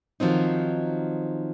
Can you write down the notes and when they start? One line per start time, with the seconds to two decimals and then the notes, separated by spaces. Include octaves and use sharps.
0.20 D#3 F3 F#3 C4 D#4